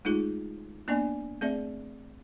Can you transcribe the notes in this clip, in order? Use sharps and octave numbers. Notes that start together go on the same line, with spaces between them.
G#3 A3 D#4 F4 G#4
A#3 B3 D4 D5 D#5 G#5
A3 C4 G#4 D5 E5